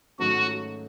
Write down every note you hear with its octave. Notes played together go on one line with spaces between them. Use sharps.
G#2 D#3 F#3 A3 C#4 F#4